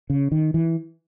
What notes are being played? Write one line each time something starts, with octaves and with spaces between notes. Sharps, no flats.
C#3
D#3
E3